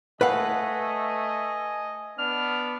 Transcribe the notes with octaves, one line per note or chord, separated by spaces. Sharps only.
A3 B4 D#5 F5 F#5 G#5
B3 D4 F6